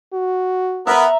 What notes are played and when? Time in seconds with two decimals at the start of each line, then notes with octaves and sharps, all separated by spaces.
0.13 F#4
0.87 B3 A#4 B4 E5 A#5